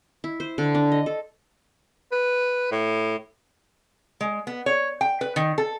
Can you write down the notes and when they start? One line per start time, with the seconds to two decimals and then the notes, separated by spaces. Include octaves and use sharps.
0.24 E4
0.40 C5
0.58 D3
0.75 D4
0.92 D#5
1.06 A4
2.12 B4
2.72 A2
4.21 G#3
4.47 B3
4.66 C#5
5.01 G5
5.21 B4
5.36 D#3
5.58 A4